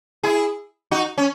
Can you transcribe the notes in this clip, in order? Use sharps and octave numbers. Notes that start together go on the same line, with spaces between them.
E4 G#4
D#4 F#4
C#4